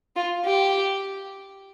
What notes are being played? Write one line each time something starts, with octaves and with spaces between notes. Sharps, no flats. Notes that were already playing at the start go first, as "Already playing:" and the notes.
F4
G4